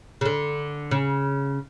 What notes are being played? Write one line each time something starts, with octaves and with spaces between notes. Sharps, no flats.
C#3
D3
C#3